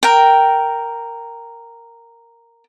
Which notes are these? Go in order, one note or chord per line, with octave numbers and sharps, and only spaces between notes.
A#4 G5